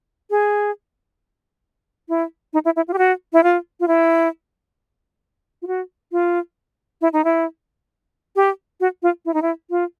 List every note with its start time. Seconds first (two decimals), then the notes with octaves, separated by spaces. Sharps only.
0.30 G#4
2.09 E4
2.53 D#4
2.65 E4
2.76 E4
2.88 F4
2.93 G4
2.98 F#4
3.33 E4
3.43 F4
3.80 F4
3.88 E4
5.62 F4
5.67 F#4
6.12 F4
7.01 E4
7.13 D#4
7.25 E4
8.36 G4
8.80 F#4
9.03 F4
9.25 E4
9.34 D#4
9.42 E4
9.70 F4